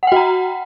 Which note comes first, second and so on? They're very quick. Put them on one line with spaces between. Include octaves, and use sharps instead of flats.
F#5 G5 F#4 A#5